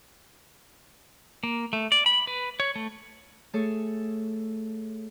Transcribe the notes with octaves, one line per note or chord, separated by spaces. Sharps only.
A#3
A3
D5
B5
B4
C#5
A3
A3 G#4 A4 C#5